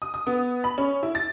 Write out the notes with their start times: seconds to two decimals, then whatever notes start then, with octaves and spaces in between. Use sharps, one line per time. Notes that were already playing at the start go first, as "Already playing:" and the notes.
0.02 D#6
0.14 D#6
0.27 B3
0.64 B5
0.78 C#4
1.03 E4
1.15 A6